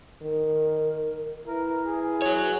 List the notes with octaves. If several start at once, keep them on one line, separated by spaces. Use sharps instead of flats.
D#3 A#4
E4 A#4 B4
G#4
F#4 C#5